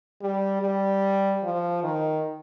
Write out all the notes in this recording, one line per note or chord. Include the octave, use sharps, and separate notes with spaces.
G3
G3
F3
D#3